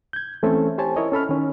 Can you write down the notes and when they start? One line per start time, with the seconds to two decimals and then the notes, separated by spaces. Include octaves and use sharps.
0.13 G6 G#6
0.43 E3 A3 C4 C#4 A4
0.78 G4 C5 C#5 G#5 A5
0.96 E4 A#4 C#5 D#5
1.12 C#4 A4 B5 F6
1.29 D#3 C#4